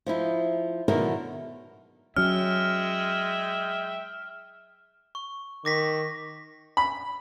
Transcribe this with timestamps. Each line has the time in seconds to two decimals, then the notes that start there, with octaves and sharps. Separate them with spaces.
0.06 F3 D#4 E4
0.88 B2 D3 D#3 F#3 E4 A#4
2.17 F#3 G#3 C#4 E5 G5 F6
5.15 C#6
5.65 D#3 D6 A#6 B6
6.77 B5